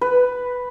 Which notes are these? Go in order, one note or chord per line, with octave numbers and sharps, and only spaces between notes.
B4